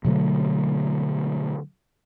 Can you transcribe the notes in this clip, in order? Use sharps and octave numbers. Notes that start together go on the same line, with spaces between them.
B2 D3 F#3 A3